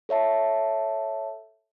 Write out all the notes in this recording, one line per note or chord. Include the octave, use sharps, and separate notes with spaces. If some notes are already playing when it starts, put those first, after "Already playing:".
A4 C#5 E5 A5